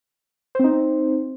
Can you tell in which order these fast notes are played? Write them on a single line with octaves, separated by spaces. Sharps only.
C5 C4 D#4